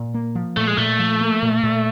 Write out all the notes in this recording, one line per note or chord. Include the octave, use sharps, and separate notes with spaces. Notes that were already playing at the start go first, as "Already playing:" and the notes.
Already playing: A#2
A#3
F3
A#2 A3
G#3
A#2 A3
F3
A#3
A#2
A#2